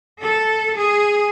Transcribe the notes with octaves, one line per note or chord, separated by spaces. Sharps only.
A4
G#4